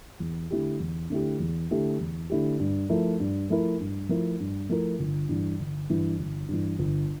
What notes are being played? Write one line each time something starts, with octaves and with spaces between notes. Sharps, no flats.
E2
D3 A3 E4 G4
E2
D3 A3 E4 G4
E2
D3 A3 E4 G4
E2
D3 A3 E4 G4
G2
F3 A3 E4 A#4
G2
F3 A3 E4 A#4
G2
F3 A3 E4 A#4
G2
F3 A3 E4 A#4
G1
G2 E3
G1
G2 E3
G1
G2 E3
G1